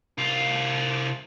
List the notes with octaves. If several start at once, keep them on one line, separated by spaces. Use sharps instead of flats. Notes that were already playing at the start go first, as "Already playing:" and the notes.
C2 F4